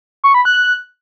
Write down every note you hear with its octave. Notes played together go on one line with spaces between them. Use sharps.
C#6
B5
F#6